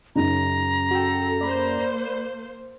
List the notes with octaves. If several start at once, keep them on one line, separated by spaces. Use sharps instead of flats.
F#2 C#3 D#4 A#5
F#4 A4 G5
A#3 C5 D5 B5